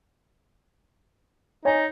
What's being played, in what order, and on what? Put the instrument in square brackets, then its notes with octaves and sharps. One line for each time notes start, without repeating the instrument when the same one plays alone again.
[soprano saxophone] D#4 [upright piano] C#5 G#5